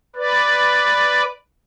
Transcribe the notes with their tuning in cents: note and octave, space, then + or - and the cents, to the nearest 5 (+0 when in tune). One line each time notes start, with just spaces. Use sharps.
B4 +0 D5 +0